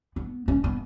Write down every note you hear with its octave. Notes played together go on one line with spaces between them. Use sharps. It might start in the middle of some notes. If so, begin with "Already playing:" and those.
B3
C#4
B3